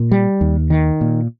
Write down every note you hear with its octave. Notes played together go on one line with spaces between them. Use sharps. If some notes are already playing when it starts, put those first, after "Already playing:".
Already playing: A#2
G3
D#2
D#3
A#2